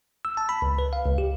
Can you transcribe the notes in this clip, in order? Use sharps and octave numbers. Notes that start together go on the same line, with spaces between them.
E6
A5
B5
C#2
B4
F5
C#2
G4